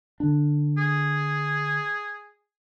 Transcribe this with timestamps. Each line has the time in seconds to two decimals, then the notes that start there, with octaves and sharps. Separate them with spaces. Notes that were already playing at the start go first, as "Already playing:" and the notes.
0.20 D3 D4
0.78 G#4